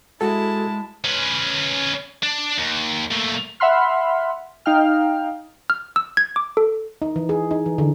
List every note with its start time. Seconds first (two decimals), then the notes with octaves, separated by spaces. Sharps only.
0.21 G#3 E4 F#4 A4 A5
1.05 C#4 B4
2.23 D4
2.58 D#2
3.11 A#2 A3
3.60 E5 F#5 B5 C6 F6
4.66 D#4 F5 G5 F6
5.70 F6
5.96 E6
6.17 G#6
6.36 D6
6.57 A4
7.02 D#4
7.16 E3
7.29 G#4
7.51 D#4
7.66 E3
7.78 D3